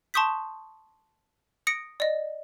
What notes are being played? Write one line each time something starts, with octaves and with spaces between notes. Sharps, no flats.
A5 C6 C#6 D#6 G6 B6
D#6 A#6 C#7 D7
D5 D#5